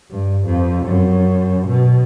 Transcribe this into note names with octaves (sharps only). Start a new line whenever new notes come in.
G2
F2
F#2
B2